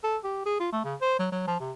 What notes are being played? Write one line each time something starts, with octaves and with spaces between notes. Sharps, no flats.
A4
G4
G#4
F4
A3
C#3
C5
F#3
F#3
F3
C3